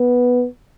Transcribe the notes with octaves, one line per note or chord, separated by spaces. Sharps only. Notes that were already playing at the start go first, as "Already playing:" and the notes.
Already playing: B3